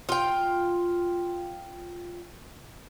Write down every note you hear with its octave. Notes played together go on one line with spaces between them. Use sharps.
F4 G5